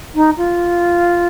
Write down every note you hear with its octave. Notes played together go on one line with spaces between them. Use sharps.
D#4
F4